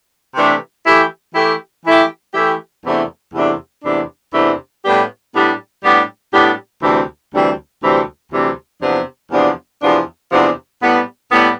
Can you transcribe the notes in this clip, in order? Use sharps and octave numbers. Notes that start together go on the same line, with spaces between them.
C3 E3 A3 D4 G4
E3 A3 E4 G4
E3 A3 E4 G4
E3 A3 E4 G4
E3 A3 E4 G4
E2 C3 E3 A3 D4
E2 C3 E3 A3 D4
E2 C3 E3 A3 D4
E2 C3 E3 A3 D4
A2 G3 B3 D4 G4
A2 G3 B3 D4 G4
A2 G3 B3 D4 G4
A2 G3 B3 D4 G4
D2 C3 E3 G3 C4
D2 C3 E3 G3 C4
D2 C3 E3 G3 C4
D2 C3 E3 G3 C4
E2 C3 F3 B3 D4
E2 C3 F3 B3 D4
E2 C3 F3 B3 D4
E2 C3 F3 B3 D4
A2 G3 B3
A2 G3 B3